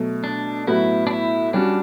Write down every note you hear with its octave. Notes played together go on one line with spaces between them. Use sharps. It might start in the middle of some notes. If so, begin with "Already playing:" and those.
Already playing: B2 F#3 A3
D4
A2 F#3 B3 E4 F#4 B4
D4
E4
G3 C#4 D4 F#4